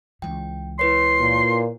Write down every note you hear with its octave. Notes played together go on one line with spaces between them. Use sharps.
C#2 E3 G5
E4 B4 C#5 C6
A#2